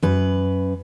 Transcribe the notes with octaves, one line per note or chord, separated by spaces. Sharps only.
F#2 B4